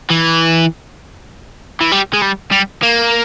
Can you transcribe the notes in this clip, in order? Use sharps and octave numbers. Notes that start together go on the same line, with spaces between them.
E3
E3
G3
G#3
G3
G3
A#3